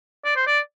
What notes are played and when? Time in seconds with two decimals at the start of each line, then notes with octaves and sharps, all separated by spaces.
0.25 D5
0.36 C5
0.47 D5